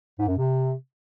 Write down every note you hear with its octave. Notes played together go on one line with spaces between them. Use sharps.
G#2
F#2
C3